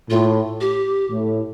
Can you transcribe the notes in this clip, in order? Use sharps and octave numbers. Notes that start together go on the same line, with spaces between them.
A2 F4
G4
A2